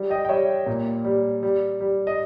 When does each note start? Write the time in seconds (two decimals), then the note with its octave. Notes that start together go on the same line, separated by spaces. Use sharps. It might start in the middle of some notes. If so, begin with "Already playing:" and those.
Already playing: G3
0.10 D#5 G5
0.25 G5
0.29 G3 C#5 E5
0.66 A#2
1.05 G3
1.43 G3
1.80 G3
2.07 D#5